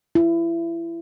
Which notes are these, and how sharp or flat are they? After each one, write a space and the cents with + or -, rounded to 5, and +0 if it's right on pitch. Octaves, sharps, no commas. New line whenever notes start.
E4 +25